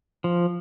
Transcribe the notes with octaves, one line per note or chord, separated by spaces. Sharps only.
F3